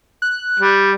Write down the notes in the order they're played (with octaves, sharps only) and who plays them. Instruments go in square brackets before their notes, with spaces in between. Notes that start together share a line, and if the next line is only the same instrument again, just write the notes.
[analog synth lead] F#6
[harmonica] G3